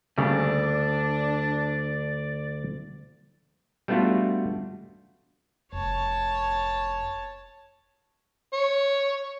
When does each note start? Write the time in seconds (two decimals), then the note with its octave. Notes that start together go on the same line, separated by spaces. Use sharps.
0.18 D2 C#3 G3 A#3 D4 D5
3.88 G3 A3 B3 D4 F4 F#4
5.73 F1 F2 C#5 A5
8.53 C#5